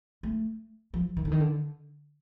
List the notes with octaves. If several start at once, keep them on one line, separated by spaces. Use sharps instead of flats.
A3
F3
D#3
D3
D#3
D3